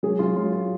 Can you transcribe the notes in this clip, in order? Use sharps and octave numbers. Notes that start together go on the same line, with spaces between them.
F#3 G#4
F#3 F4
F#3 F4
F4